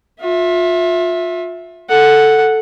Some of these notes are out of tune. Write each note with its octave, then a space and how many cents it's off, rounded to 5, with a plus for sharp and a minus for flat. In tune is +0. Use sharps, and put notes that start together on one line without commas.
F4 +30 E5 +0
A4 +0 F#5 +0